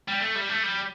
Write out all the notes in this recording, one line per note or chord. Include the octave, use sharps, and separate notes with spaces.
G3
A3
G3
A3
G3